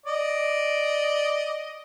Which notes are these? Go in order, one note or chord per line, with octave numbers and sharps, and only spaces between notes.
D5 D#5